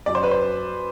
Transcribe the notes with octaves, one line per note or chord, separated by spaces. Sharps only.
F#2 F#3 D5
C5
B4
C5